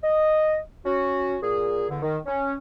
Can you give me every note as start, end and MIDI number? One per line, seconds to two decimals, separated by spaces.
0.03 0.59 75
0.85 1.37 61
0.85 1.37 66
1.42 1.85 46
1.42 1.85 68
1.90 1.99 40
1.90 1.99 50
2.02 2.19 51
2.26 2.54 61